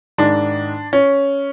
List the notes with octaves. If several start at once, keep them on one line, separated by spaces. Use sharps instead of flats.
G#2 D#3 G#3 D4
C#4